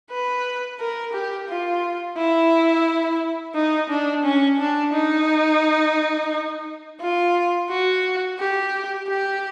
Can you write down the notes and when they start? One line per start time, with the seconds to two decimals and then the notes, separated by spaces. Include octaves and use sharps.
0.11 B4
0.80 A#4
1.14 G4
1.49 F4
2.17 E4
3.55 D#4
3.90 D4
4.24 C#4
4.60 D4
4.93 D#4
7.01 F4
7.70 F#4
8.39 G4
9.08 G4